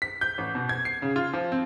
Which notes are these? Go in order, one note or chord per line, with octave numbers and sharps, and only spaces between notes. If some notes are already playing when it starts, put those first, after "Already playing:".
B6
G6
A1
B2
G#6
C7
C#3
F4
F3
C4